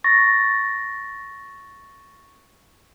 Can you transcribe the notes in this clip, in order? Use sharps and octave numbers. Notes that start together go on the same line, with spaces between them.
C#6 A6 A#6